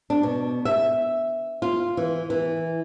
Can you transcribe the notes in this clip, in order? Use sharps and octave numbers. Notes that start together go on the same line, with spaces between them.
D4
B2
E5
F4
E3
E3